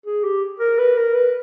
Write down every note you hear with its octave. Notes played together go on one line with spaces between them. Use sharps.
G#4
G4
A#4
B4
A#4
B4